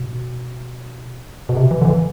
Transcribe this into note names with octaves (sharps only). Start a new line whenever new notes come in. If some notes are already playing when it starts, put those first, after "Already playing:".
Already playing: B2
B2
C3
E3
D3
E3